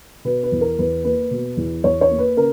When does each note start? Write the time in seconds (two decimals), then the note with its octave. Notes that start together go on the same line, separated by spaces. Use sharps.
0.25 B2 B4
0.43 B4
0.52 E2
0.61 A#4
0.79 E2 B4
1.04 A#3 B4
1.31 B2
1.57 E2
1.84 E2 C#5
2.01 C#5
2.11 A#3
2.18 B4
2.37 C#3 A#4